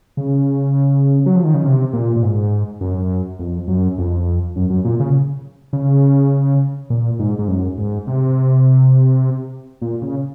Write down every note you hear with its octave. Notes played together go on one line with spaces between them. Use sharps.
C#3
F#3
F3
D#3
C#3
C3
A#2
A#2
G#2
F#2
F2
F#2
F2
F#2
F#2
A#2
C#3
C#3
A#2
G#2
G#2
F#2
G#2
C3
A#2
C#3